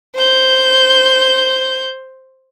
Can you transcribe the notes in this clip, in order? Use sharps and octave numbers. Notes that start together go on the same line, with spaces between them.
C5 G6